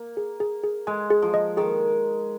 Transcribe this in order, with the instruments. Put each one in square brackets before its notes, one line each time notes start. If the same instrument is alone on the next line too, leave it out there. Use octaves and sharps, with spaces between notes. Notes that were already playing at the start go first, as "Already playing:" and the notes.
Already playing: [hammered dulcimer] A#3
[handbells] G#4
G#4
G#4
[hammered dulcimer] G#3 [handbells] G#5
[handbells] G#4
[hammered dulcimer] F3
[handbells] D#5
[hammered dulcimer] D#3 [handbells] G#4